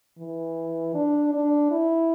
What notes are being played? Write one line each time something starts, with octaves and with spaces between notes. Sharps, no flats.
E3
D4
D4
E4